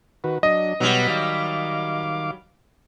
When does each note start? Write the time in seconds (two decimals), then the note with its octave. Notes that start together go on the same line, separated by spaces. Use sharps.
0.24 D#3 F#4 B4
0.43 F#3 D4 D#5
0.80 B2 F#3 G3 B3 F#5
1.09 D#3 F5 D6